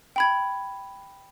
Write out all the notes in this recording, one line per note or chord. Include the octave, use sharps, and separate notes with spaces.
G5 B5 G#6